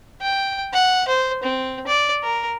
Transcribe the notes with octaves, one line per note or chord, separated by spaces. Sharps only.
G5
F#5
C5
C4
D5
A#4